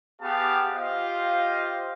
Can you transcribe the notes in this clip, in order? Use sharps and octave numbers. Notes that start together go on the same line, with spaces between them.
B3 G4 G#4 F5 A5
F4 G4 C5 D#5 F5